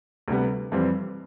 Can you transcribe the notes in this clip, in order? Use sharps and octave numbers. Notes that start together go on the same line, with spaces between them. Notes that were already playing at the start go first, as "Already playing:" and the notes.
D2 C3 G3 B3
F2 E3 G3 C4